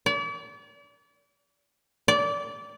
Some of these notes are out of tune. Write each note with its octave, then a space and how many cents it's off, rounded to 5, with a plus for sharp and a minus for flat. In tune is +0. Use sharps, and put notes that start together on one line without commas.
D5 -40
D5 -25